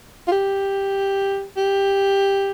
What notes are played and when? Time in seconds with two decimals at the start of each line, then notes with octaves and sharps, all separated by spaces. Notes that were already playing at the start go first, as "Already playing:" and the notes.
0.28 F4
0.32 G4
1.57 G4